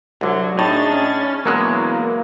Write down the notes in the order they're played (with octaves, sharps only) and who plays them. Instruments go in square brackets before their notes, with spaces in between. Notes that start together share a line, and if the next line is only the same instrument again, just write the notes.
[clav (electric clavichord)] C2 D3 [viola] F#3
[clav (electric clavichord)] A2 [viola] D4 G#4 [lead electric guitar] D#4 [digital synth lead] A6
[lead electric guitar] C#4
[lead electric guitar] E2 [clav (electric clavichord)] B2 F#3 G#3 [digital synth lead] A#3 [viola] E4